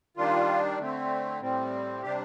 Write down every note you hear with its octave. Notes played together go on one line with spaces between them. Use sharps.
D#3 G3 D4 F4
D3 A3 C4
A2 G3 C4
C3 G3 D4 G4